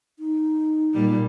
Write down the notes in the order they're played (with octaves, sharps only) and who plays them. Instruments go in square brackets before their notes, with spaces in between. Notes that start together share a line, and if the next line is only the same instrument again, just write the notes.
[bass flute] D#4
[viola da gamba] A#2 G3